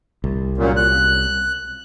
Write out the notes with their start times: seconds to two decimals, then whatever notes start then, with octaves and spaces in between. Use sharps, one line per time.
0.24 C2
0.58 F#2 A#2
0.77 F#6